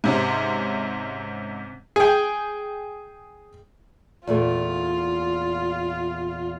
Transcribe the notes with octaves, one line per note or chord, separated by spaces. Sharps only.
G#2 C3 C#4
G#4 G5
E2 A#2 A3 F4